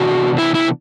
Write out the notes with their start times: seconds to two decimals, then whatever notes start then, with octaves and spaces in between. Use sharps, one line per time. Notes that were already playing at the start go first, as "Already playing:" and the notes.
Already playing: C3 E3 B3 D4 F#4
0.38 E4
0.55 E4